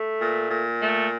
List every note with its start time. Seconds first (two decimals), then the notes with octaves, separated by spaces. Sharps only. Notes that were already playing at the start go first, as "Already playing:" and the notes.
Already playing: A3
0.22 A#2
0.50 A#2
0.81 A3